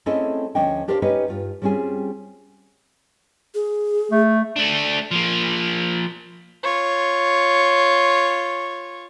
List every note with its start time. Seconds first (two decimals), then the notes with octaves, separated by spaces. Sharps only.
0.06 A3 C4 C#4 E4 G#4 D#5
0.55 D2 F3 C#4 D4 D#5 G5
0.88 D4 G4 A#4 C5 D5 F5
1.02 C#4 D#4 G4 B4 C#5 D#5
1.28 G2 F4
1.62 G3 C4 C#4 F4 G#4
3.55 G#4
4.11 A3
4.56 A3 D4
5.11 F3 A#3
6.63 F4 C#5